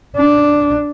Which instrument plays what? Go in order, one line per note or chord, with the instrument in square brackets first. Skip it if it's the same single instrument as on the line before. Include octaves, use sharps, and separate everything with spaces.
[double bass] D4